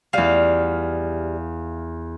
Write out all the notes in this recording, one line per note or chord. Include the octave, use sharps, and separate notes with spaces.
E2 G3 F4 F5